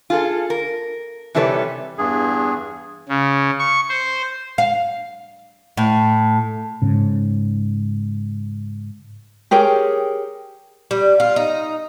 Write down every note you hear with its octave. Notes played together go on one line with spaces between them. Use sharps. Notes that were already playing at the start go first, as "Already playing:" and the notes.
F4 G#4 A4
A#4
C3 E3 G3 A4 B4 C#5
E2 G2 G#4
C#3
C#6
C5
F5
A2
G#2 C#3
G4 G#4 A#4 C#5
G3
F4
D#4